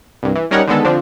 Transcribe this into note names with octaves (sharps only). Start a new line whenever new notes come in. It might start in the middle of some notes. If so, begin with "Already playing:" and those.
C2 G2
E3
G3 C#4 D#4 A#4 C#5 F#5
D3 D#3 G#3 B3 A4
D3 F3 C4 D4